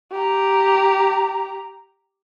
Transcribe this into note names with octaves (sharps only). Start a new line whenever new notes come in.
G4 A#5